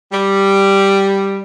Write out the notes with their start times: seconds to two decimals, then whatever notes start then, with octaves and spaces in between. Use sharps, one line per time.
0.12 G3